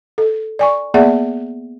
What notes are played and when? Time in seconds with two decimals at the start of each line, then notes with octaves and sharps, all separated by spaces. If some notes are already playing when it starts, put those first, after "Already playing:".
0.18 A4
0.59 D5 G#5 C#6
0.94 A#3 B3 G#4 D5 E5 F#5